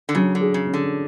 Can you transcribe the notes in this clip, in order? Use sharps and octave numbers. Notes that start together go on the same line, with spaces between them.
D3
C#3 F#3
D3
G#4
C#3
C#4
D3